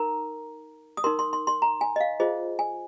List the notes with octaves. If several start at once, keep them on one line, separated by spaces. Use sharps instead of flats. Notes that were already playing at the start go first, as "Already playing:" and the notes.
Already playing: D#4 A#4 A#5
D#6
D#4 A#4 C6
C6
C6
C6
A#5
G#5
D#5
F5
F4 G#4 C5 D#5
G#5